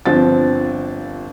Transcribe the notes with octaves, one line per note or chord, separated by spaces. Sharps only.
G1 F3 C4 A6